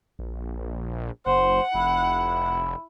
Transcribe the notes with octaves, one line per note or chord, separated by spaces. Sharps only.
A#1
F#1 C5 F#5
F1 E4